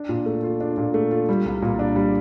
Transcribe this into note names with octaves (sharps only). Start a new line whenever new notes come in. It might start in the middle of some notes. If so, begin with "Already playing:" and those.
Already playing: D4
A#2
A3
F4
D4
A#2
A3
F4
G3
C2
A#2
D4
G3